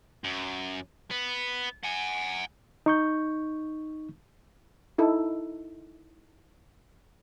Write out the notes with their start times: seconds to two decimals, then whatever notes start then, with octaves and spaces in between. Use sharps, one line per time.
0.24 F#2
1.11 B3
1.84 F#5 G#5
2.86 D#4 C#6 G6
4.98 D#4 E4 A4